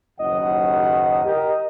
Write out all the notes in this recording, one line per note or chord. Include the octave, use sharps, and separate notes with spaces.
F#1 D#2 D#5 F#5
G4 A#4